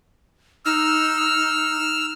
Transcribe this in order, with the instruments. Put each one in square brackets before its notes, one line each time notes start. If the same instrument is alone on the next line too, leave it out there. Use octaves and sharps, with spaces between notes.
[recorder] D#4 [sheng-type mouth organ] E6 F6